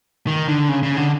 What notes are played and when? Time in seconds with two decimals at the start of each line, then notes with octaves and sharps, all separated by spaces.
0.27 D#3
0.48 D3
0.69 C#3
0.83 C#3
0.97 D3